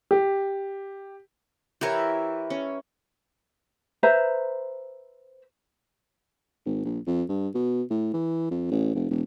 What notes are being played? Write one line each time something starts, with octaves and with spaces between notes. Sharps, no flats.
G4
E3 E4 G4 A#4 C#5
C#4
B4 C5 E5 A#5
G#1
A#1
F2
G2
B2
A2
E3
F2
A1
F1
E1